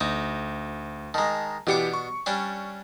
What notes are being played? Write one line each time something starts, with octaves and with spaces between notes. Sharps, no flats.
D2 D#4
D#3 G#3 A5 A#5
B2 E3 D4 G4 D6 C#7
C#6
G3 C#4 D4